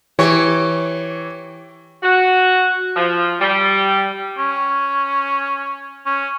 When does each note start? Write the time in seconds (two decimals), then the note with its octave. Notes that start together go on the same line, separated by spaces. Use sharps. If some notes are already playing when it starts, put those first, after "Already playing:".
0.19 E3 G4 C#5
2.03 F#4
2.96 F3
3.40 G3
4.38 C#4
6.06 C#4